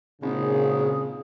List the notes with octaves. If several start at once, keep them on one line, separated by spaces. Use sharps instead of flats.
G#1 A#2 C#3 G#4